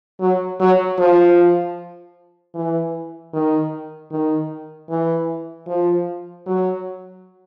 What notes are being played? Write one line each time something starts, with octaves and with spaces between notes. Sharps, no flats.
F#3
F#3
F3
E3
D#3
D#3
E3
F3
F#3